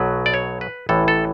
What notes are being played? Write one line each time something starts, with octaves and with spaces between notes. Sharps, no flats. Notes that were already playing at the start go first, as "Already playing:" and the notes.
Already playing: B1 B2 F#3 B4
D5
C#5
B4
A1 A2 E3 A4
A4